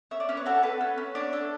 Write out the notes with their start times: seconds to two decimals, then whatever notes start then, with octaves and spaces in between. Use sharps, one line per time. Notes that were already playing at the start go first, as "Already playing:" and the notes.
0.11 C#4 E5
0.20 D5
0.29 C#4 C#5
0.37 B4
0.46 F#4 A4
0.63 A4 B4
0.81 C#4
0.98 C#4
1.15 D4 C#5
1.33 A4